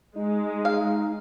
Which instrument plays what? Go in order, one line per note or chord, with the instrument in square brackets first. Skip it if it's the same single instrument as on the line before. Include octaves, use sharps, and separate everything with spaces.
[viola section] G#3 [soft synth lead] D#4
[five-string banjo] F5